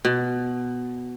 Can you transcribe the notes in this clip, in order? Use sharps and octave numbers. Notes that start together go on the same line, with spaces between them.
B2